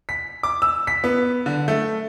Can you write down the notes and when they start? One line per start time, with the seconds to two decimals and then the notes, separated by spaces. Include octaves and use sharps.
0.09 B6
0.43 D6
0.62 E6
0.87 B6
1.04 B3
1.46 D3
1.68 A3